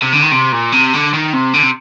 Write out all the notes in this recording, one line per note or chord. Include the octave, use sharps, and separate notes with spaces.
C3
D3
D#3
C3
A#2
C3
D3
D#3
C3
D3
C3